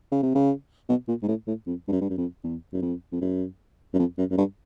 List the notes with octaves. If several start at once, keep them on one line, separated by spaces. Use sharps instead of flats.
C#3
C3
C#3
B2
A#2
G#2
A2
A2
F2
G2
F#2
G2
F#2
F2
E2
F#2
F2
F2
F#2
F#2
F2
F#2
F#2
G2